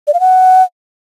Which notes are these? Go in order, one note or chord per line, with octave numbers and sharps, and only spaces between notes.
D5
F5
F#5